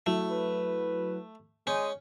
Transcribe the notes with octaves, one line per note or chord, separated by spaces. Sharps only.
F#3 A3 E4 F#4
B4
G#3 C#4 G6 D#7